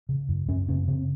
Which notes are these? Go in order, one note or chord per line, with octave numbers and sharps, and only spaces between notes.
C#3
F#2
F#2 C#4
C#3 C#4
C#3 C4